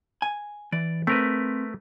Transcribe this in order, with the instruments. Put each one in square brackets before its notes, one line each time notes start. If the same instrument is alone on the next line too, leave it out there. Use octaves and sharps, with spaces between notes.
[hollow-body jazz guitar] G#5
[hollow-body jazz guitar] E3 [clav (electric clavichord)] D5
[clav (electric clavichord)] A3 A#4 B4 [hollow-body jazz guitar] C4